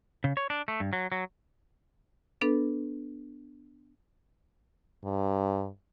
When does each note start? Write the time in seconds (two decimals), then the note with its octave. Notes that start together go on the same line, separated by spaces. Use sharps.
0.24 C#3
0.37 C#5
0.50 D4
0.68 A3
0.80 G2
0.93 F#3
1.12 F#3
2.41 B3 D4 A4 B4
5.04 G2